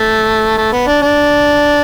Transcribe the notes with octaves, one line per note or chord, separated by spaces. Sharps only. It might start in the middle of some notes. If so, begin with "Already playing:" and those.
Already playing: A3
A3
B3
D4
D4